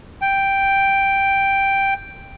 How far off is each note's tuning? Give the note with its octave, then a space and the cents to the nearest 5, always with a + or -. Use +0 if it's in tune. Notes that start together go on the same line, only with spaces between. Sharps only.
G5 +0